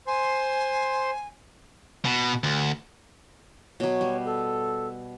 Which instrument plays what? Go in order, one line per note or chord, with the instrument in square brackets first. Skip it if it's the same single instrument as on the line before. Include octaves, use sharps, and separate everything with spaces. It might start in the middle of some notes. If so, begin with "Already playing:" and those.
[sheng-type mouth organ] C5 C6 [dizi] G#5
[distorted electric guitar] B2
D2
[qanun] B2 F#3 [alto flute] C#5
[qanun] G3
[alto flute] A4